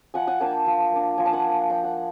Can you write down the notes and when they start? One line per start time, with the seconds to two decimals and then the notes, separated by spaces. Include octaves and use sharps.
0.14 F3 F#5 G#5
0.27 F#5 G#5
0.40 A#3 D4 G5 A5
0.66 F3
0.92 A#3 D4
1.18 F3 G#5
1.26 A5
1.33 F#5 G#5
1.44 A#3 D4
1.70 F3 G5
1.84 F#5